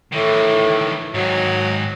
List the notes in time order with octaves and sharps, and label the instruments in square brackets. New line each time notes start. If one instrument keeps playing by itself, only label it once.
[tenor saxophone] A2 [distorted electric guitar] D#3 E3
[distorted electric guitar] G#2 D#3 [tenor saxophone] F#3